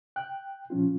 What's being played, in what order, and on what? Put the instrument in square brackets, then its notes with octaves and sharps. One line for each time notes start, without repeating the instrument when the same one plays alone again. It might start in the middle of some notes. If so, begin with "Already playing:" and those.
[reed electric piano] G5 F#6
A#2 F3 C#4 F4